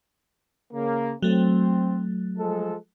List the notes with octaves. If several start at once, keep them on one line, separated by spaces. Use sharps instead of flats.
C#3 A#3
F#3 A3 C4
F3 G#3 A4